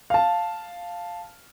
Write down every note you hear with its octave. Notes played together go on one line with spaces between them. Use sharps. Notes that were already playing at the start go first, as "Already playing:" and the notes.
F5 A5